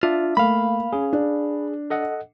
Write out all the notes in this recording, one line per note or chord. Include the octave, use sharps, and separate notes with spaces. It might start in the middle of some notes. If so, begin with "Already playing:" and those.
D4 F4 D5 E5
A3 A#3 F5 B5
C#4 G#4
D4
A4 D#5 F#5